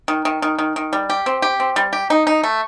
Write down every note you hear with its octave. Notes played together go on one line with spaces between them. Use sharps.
D#3
D#3
D#3
D#3
D#3
G3
G4
C4
G4
C4
G3
G4
D#4
D#4
A3